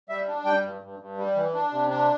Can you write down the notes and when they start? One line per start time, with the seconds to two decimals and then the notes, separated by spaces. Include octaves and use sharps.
0.09 G3 E5
0.27 D4
0.45 G3 G5
0.63 G2
0.82 G2
1.00 G2
1.17 G3
1.35 E3
1.54 D4
1.71 C3
1.90 D4